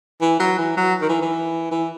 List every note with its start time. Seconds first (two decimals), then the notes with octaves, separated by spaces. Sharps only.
0.21 E3
0.40 F#3
0.58 E3
0.77 F#3
1.01 D#3
1.09 E3
1.21 E3
1.71 E3